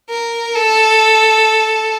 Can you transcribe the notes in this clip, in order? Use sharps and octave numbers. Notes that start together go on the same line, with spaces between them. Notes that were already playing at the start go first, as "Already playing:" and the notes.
A#4
A4